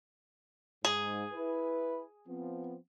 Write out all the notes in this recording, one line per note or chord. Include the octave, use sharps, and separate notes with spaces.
G#2 G#4
E4 B4
F3 B3 C4